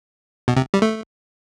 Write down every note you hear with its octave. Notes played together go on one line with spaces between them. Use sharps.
B2
C3
G3
A3